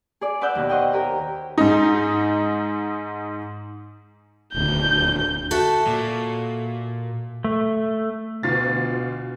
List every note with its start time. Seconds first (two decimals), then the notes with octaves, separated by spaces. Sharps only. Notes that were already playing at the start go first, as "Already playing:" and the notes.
0.21 G#4 D5
0.41 B4 D5 F#5 D6 E6 G6
0.55 D#2 B2
0.69 C5 C#5 D#5 F#5 G5
0.93 G4 A#4
1.58 G#2 D#4
4.54 D#1 D2 G6
5.51 F#4 A4 E5
5.87 A#2
7.44 A3
8.43 D2 B2 F4 A6